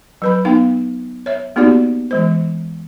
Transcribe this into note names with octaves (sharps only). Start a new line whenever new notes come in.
F#3 B4 B5
B3 D#4 F5 G5
C#5 E5
A#3 B3 D#4 F#4 G4 D5
E3 G#3 C5